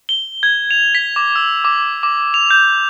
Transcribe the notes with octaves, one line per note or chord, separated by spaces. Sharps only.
G7
G#6
F7
B6
D6
E6
D6
D6
F7
G6